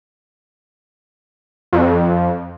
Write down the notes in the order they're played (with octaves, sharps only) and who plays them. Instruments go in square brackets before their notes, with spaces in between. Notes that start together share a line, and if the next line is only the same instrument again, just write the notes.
[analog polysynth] F2